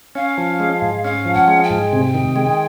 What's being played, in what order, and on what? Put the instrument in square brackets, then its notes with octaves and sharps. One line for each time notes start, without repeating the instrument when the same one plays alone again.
[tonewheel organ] C#4 [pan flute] F5
[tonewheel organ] F3
G#3
G#2
[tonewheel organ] C#4 [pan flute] F5
[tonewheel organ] F3
[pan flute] F#5
[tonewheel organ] G#3
[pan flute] G5
[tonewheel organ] G#2
C3
D#3
G#3